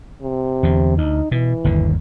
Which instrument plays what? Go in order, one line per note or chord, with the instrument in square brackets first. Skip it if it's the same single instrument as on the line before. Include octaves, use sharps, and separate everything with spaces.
[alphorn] C3
[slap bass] E2 D3
[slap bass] D2 [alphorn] D#4
[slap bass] B2 [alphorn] E3
[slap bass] G1 D#2 D3